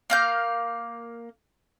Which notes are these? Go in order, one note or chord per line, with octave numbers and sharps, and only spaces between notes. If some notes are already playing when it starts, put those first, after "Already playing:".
A#3 F5 G6